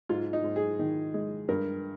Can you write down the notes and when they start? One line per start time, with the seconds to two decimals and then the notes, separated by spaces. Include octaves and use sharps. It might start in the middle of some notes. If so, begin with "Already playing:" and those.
0.09 G#2 F4
0.33 D#4
0.44 G#2
0.56 G#4
0.79 D#3
1.14 G#3
1.49 G2 A#4